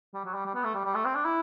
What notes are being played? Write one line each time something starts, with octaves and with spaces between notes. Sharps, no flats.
G3
F#3
G3
G3
B3
A3
G3
G3
A3
C4
D4
E4